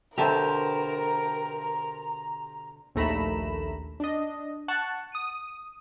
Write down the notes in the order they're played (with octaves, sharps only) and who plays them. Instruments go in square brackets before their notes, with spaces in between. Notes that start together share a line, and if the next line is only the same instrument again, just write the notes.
[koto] B2 D3 E5 [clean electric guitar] G4 A4 C5 [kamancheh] A#4 [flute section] A#5
[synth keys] A#1 D#2 A3 A#5 B5 E7
D4 D#5
F#5 A5 C#6 F#6
D#6 D#7